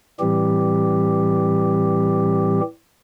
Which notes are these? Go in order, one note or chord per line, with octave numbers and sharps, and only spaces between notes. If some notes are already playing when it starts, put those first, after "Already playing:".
A2 E3 G3 C4 G4